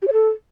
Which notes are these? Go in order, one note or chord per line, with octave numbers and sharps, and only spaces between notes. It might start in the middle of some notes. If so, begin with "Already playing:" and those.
G4
C#5
A4